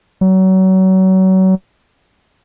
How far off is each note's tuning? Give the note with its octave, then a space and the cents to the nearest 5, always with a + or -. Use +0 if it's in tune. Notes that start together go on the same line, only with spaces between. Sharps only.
F#3 +30